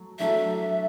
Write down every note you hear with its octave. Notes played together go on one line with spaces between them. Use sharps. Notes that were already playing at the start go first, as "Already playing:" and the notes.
Already playing: F#3 A3
F#3 A3 D4 A4 E5